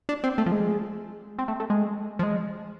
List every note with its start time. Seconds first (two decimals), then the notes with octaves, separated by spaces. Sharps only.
0.09 D4
0.24 C4
0.38 A3
0.46 F3
0.52 G#3
1.39 C4
1.48 A3
1.60 A3
1.70 G#3
2.19 F3
2.23 G#3